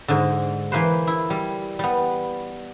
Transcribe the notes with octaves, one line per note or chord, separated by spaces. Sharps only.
G#2 D3
E3 A#3 B4 C5
E4
G3
G3 B3